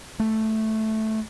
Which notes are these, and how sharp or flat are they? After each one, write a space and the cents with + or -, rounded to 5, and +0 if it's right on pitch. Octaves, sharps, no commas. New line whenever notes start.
A3 -5